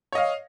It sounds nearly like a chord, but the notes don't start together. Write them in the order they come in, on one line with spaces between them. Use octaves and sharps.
C#5 D#5 F5